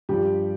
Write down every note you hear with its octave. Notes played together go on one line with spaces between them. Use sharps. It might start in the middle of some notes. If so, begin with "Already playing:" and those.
G2 F3 G3 G4